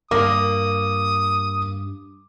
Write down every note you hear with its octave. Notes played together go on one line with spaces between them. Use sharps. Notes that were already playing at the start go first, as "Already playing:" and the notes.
G2 A#3 D6 D#6